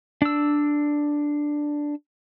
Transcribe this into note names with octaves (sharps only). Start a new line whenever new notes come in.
D4 E6